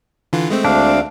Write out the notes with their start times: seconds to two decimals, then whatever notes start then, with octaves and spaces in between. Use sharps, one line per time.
0.33 D3 E3 F4
0.50 G#3 A3 C4
0.65 D2 D4 F5